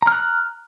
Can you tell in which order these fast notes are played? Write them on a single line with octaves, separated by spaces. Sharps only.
A#5 F6 F#6